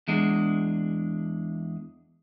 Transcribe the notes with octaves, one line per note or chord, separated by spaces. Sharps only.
E2 G#3 D4